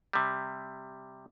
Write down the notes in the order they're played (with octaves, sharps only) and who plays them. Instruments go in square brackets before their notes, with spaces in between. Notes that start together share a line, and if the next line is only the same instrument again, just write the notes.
[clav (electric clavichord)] C3 G3